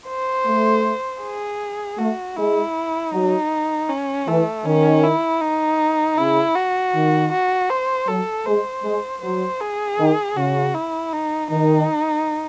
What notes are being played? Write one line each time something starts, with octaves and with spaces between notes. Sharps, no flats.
C5
A3
G#4
A3 F#4
G#3 E4
F#3 D#4
C#4
E3 A3
D#3 C#4
E4
D#4
C#3 E4
F#4
D#3
F#4
C5
F#3 A4
G#3 C5
G#3
F#3 C5
G#4
D#3
C#3 F#4
E4
D#4
D#3 D#4